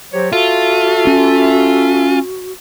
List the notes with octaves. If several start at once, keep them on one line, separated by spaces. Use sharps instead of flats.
F#3 G4 C5 C#5
F4 F#4 A4 E5
C#4